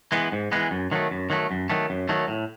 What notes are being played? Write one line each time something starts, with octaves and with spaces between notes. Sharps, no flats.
E3 G#3 B3
G#2
E3 G#3 B3
F#2
D#3 F#3 A3
F#2
D#3 F#3 A3
F#2
D#3 F#3 A3
F#2
D#3 F#3 A3
A2